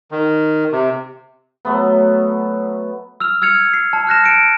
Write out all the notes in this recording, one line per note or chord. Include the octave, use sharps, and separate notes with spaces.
D#3
C3
F#3 A3 B3
E6 F6 F7
E6 F6 G#6 C#7 F7
C7
A5
F6 F#6 A#6 E7
C#7 D7